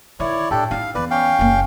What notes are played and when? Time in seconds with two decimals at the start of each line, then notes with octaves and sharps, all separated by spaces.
0.20 D#3 E4 C#5 D5
0.51 A2 D4 G4 A4
0.71 D#4 E4 F5
0.95 E2 E3 B4 D5
1.11 C#4 F5 G5
1.39 F#1 A#3